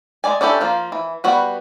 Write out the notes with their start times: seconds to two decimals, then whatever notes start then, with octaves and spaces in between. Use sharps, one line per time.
0.24 G#3 D#4 D5 G#5
0.41 C#4 D4 E4 G4 A4
0.61 F3 A#3 F4
0.92 E3
1.24 G3 B3 F#4 B4